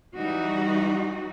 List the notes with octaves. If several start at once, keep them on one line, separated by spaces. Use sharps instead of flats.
E3 G3 D#4 F#4